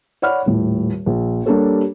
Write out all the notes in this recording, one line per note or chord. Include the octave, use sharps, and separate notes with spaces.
C#5 D5 F#5 B5 F6
D#1 A2
A#1
G3 A#3 D4 G4 A4 C#5